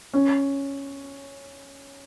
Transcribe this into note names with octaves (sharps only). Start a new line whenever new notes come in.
C#4